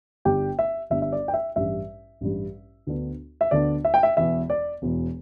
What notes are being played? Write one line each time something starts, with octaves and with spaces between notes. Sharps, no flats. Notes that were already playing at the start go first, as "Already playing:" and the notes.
G1 G2 G3 D4 G4 G5
E5
G1 G2 G3 D4 E5
E5
D5
G5
E5
A1 G2 G3 E5
A1 G2 G3
D2 D3 B3 D4
E5
D2 D3 B3 D4 D5
E5
G5
E5
E1 E2 E3 E5
D5
E1 E2 E3